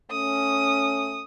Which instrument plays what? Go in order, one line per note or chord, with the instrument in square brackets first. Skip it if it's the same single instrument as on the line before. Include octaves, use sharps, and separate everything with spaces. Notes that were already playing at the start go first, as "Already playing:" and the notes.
[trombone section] A3 C#4 [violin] D#6